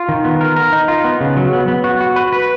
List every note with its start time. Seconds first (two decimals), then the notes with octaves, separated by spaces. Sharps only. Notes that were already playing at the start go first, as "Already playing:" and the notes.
Already playing: F4
0.09 D#3
0.25 B3
0.41 A#4
0.56 A#4
0.73 D#4
0.88 F4
1.04 B3
1.21 C#3
1.37 F#3
1.53 B3
1.68 B3
1.84 F#4
2.01 F#4
2.16 B4
2.32 B4